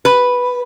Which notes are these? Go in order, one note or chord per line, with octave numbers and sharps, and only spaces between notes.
B4